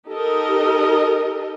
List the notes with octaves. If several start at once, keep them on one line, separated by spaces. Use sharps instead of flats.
D#4 G4 A4 A#4 D#5